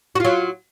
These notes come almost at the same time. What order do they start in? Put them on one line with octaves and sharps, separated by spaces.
F#4 F4 F#3